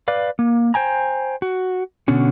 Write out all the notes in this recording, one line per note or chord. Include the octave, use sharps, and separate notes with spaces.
B4 D5 F5
A#3
C5 G5 G#5 A#5
F#4
B2 D3 B3 C#4 F#4